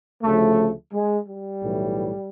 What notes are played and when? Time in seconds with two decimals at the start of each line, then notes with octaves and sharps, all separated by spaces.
0.23 D2 C#3 F3 A3
0.93 G#3
1.28 G3
1.63 B1 A2 E3